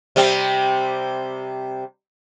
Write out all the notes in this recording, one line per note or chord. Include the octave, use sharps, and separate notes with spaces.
C3 G3 C4